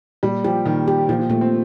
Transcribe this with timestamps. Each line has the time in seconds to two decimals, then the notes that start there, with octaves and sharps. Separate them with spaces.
0.23 A#2 G3
0.44 F3 G4
0.65 A#2 D#3
0.88 G4
1.09 A#2 F3
1.19 F3
1.30 A#2 A3
1.41 C4